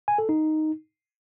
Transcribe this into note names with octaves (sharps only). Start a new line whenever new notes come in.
G#5
A4
D#4